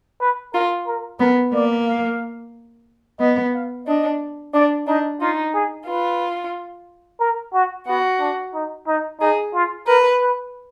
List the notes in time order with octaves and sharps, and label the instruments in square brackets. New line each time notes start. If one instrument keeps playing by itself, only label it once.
[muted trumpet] B4
[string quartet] F4 [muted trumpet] A#4
[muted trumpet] A#4
[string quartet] B3 [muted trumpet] A#4
[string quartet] A#3 [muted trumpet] D5
[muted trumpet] F5
[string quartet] B3 [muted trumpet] D#5
[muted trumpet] F5
[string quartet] D4 [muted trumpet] D#5
[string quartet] D4 [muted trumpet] D5
[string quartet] D4 [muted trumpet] D#4
[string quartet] D#4 [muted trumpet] F4
[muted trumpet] G#4
[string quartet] F4 [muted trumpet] B4
[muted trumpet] A#4
F#4
[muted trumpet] B3 [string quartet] F#4
[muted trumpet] D4
D#4
D#4
[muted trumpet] D#4 [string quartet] G#4
[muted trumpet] F4
[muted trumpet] A#4 [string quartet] B4
[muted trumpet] B4